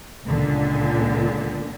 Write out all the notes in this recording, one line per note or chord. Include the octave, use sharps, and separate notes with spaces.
C#2 A#2 D3